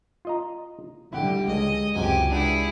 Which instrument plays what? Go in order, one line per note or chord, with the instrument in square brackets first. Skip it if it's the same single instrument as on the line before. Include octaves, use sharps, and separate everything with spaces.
[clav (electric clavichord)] F4 D#5 A#5
[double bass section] D3 G3 [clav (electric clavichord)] E4 F#5 [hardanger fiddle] G4
[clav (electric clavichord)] C#2 [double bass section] G#3 [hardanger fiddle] D#5
[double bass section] C#2 [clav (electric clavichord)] F#2 C3 [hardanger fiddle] G4 G#5
[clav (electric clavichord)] D4 F#5 G5 [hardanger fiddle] E4 G#4